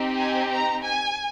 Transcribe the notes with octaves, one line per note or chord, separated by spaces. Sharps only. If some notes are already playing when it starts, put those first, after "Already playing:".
Already playing: C4 D#4 G4
G#5
A#5
G#5